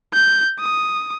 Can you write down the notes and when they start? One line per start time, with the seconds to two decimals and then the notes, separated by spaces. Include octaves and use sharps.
0.13 G6
0.60 D#6